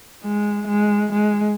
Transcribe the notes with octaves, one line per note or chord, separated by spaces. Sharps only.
G#3
G#3
G#3